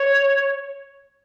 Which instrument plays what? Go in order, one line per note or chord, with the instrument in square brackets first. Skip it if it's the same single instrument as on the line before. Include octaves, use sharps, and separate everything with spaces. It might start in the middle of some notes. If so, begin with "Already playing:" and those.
Already playing: [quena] C#5